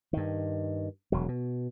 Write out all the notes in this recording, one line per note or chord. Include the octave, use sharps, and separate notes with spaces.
G2 D#3
E1 F#3
B2